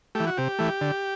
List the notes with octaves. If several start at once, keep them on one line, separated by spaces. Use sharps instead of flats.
A3 G4
E3
F#4
C3 G4
E3 A3
D3